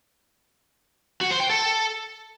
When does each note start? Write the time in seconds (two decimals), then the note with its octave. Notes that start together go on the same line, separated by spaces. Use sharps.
1.21 F#4
1.31 C5
1.40 G5
1.50 A4